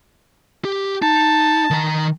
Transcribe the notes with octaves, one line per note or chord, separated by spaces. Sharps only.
G4
D#4 A5
D#3 A#5